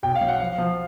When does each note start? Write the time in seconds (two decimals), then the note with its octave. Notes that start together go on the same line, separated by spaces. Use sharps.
0.03 B1 G5
0.15 F5
0.21 F#3
0.28 F#5
0.40 F3 F5
0.58 F3